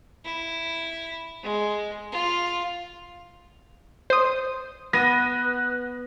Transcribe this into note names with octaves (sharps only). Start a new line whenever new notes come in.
E4
G#3
F4
C5 D#6
B3 F#6 A#6 D#7